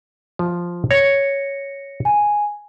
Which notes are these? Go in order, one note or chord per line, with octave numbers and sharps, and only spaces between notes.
F3
C#5 A#6 C#7
G#5